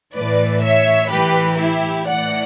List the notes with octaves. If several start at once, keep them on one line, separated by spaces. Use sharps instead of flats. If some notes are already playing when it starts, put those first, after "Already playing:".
A2 E3 B4 D5
C#5 E5
A2 E3 G4 B4
E4 G4
A2 E3 D5 F#5